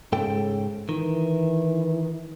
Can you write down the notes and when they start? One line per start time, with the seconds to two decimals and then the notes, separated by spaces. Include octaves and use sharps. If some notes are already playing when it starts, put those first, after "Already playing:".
0.13 G#2 C#3 A4 G5
0.89 D#3 E3